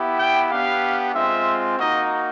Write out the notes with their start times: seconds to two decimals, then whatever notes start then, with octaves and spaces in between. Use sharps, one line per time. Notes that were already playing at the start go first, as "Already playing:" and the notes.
Already playing: B3 E4 G4
0.19 G5
0.50 B3 D4 G4 F5
1.14 G#3 C4 F4 E5
1.78 A#3 D#4 F#4 D#5